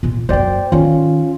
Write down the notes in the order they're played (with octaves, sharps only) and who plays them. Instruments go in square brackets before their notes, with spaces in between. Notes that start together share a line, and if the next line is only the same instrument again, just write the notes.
[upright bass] A#2 F4
[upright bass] F#2 A#3 [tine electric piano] C5 D5 G5
[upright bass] D#3 D#4 [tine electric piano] C#4 F4